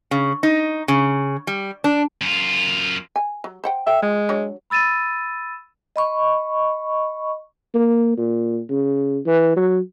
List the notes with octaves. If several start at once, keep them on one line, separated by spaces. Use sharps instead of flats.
C#3
D#4
C#3
G3
D4
F#2 F4
G#5
F#3
C5 F#5 G5
A4 E5 G5
F3 G#3
F#3 D4 C#5
B5 E6 A6 D#7 E7
D#5 B5 C#6
A#3
A#2
C#3
E3
F#3